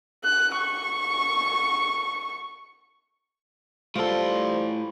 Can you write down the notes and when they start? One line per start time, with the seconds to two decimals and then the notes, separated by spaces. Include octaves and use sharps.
0.24 F#6
0.59 C#6
3.95 A2 G3 F4 A4 C5 C6